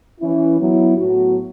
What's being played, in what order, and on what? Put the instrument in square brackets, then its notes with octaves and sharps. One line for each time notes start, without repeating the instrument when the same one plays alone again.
[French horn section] E3 C#4 E4
F#3 B3 E4
A2 F#3 B3 F#4